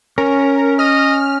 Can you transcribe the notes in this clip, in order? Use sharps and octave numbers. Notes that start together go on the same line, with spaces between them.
C#4 A#4
D#5 F6